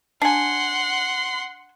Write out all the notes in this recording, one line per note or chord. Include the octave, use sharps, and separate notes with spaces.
D4 F#5 G#5 C6